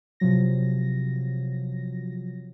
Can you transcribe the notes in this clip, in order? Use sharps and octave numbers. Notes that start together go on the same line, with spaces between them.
C3 F3 F#3 A#6